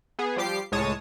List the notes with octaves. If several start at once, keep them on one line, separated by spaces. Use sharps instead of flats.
B3 G#4
F3 G3 G4 D6 C7
C#2 A2 G#3 C#5 A5 D#6